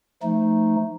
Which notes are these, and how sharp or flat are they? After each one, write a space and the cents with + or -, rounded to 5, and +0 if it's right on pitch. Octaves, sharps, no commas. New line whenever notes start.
F3 -20 A3 +0 D#4 +0